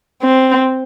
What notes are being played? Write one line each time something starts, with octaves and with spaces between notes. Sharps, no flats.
C4